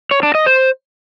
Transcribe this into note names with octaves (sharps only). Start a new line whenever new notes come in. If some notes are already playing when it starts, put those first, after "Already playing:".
C#5
D4
D#5
C5